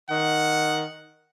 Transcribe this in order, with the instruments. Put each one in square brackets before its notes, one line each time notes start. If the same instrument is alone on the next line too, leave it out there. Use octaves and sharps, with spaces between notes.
[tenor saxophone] D#3 [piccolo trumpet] F#5